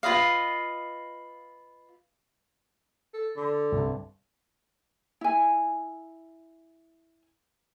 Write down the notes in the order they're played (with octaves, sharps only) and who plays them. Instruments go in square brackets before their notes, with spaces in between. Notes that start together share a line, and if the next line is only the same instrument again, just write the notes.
[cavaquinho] F4 B4 D#5 F5
[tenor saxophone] A4
D3
[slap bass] C2 G2
[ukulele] E4 G#5